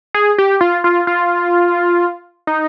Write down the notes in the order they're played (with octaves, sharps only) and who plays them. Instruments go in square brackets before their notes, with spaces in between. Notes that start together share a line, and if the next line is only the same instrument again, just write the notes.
[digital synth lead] G#4
G4
F4
F4
F4
D#4